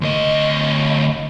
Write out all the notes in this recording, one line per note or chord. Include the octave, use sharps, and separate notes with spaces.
D2 D#5